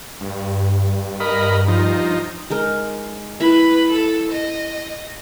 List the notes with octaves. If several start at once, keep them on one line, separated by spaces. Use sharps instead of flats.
G2
A#4 D#5 B5
F3 D#4
G#3 D#4 A#4
E4 B4 E5 B5
A4
D#5